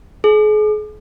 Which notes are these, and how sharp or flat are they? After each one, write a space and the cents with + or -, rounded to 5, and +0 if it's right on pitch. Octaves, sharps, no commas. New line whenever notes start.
G#4 +40